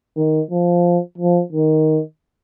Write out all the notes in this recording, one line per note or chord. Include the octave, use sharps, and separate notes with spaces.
D#3
F3
F3
D#3